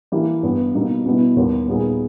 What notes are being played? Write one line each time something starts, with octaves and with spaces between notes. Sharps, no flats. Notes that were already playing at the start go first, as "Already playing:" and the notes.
E3 A#3 E4 G4
G2 G3 B3
B2 G3 A#3 D#4
B2 G3 B3 E4
D#2 D#3 G3 B3
A#2 G3 B3 D#4 G#4